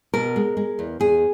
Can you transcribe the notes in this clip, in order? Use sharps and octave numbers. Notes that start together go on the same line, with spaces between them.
B2 A#4
G#3
G#3
E2
E2 G#4